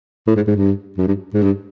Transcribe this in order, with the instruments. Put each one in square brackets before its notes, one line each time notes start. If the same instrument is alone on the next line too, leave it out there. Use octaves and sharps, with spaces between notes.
[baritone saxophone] A2
G#2
G#2
G2
F#2
G2
G#2
G2